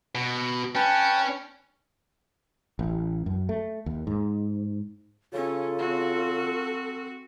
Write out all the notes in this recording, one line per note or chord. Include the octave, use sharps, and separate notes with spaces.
B2
C#4 B4 G5 A5
A1
F#2
A3
D#2
G#2
C#3 C#4 F4 A4
C4 F#4